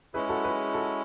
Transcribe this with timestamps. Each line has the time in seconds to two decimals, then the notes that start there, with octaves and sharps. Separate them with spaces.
0.14 G#3 C#4 E4 G#4 B4
0.29 F#4 A4
0.44 G#4 B4
0.74 F#4 A4